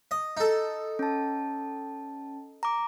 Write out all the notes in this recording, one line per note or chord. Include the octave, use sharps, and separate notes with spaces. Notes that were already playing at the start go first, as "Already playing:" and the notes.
D#5
D#4 A4
C#4 A5
A#5 D6